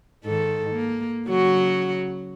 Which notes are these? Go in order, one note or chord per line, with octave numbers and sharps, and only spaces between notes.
G#2 D#3 A4
A#3
C#3 F#3 F#4